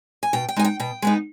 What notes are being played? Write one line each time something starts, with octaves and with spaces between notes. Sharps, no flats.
G#5
B2 G5
G5
G#3 B3 D#4 G#5
G5
B2 G5
G#3 B3 D#4